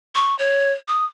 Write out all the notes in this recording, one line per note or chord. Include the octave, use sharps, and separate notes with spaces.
C#6
C#5
D#6